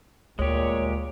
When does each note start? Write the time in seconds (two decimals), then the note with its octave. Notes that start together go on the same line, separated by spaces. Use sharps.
0.39 D2 A#2 G#3 G4 C#5